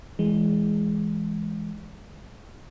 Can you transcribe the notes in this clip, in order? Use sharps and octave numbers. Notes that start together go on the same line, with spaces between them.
E3 G#3